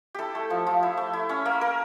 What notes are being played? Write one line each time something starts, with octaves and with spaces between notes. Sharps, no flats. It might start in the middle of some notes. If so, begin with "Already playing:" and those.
E4 G4 A4
A3
F3
F3
E4
A3
E4
C#4
A#3
A#3 A#4